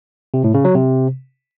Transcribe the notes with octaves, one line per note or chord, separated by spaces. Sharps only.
C3
A2
C#3
F#3
C3